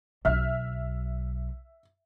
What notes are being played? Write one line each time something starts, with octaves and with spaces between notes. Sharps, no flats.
B1 F#3 E5 F6